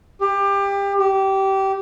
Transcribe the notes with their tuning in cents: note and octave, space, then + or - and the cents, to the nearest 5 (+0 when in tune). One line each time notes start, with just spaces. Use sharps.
G4 +25
G4 -20